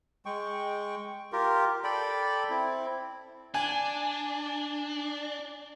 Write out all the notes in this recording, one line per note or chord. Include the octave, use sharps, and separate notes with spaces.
G#3 G5 C#6
F4 G4 A#4
A4 D5 G5 B5
C4 E4
D4 G#5